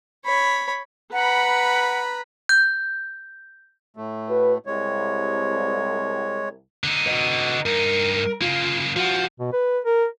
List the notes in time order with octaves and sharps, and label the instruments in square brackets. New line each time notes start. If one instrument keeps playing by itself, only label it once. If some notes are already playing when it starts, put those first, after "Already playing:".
[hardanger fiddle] C#5 B5
[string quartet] B4 A#5 B5 [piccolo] F#5
[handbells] G6
[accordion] A2 A3
[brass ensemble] F#4 B4
[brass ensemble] C2 [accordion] G#3 C#5
[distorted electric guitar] D3 D#4
[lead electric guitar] B4 D#5
[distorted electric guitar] G2 D#4 [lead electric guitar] A#4
[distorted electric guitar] C#3 A#3 [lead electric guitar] F4
[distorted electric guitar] F3 [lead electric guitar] F4 F#4
[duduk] B2
B4
A#4